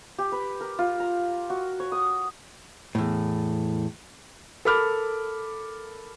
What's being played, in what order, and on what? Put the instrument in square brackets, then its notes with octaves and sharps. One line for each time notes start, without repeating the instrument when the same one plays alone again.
[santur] G4
B4
A#4
F4
A#5
F#4
C#5
D#6
[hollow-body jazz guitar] E2 A2
[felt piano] A4 A#4 B5 D6 F6